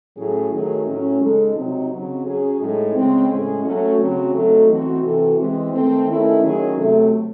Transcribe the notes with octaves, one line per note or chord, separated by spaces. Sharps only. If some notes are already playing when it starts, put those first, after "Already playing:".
A2 F#3 C#4 G#4
D#3 F#3 A3 D#4 G#4
A2 F#3 C#4
C#3 G#3 D#4 A4
C3 F#3 C4 D#4
C#3 F#3 C4
F#3 C#4 G#4
A2 G#3 D#4 G#4
C#3 G#3 C4
A2 G#3 C#4 G#4
F#3 A3 C#4 F#4
C#3 F#3 C4 F#4
F#3 A3 C4 D#4 A4
E3 C4 D#4 F#4
C3 E3 C4 F#4 A4
E3 G#3 C4
D#3 A3 C4
D#3 A3 C#4 E4 G#4
D#3 F#3 C#4 G#4
C3 F#3 A3